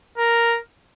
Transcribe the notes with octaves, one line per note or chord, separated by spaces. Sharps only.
A#4